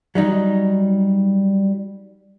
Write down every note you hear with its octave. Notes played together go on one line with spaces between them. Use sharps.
F#3 G3 D#4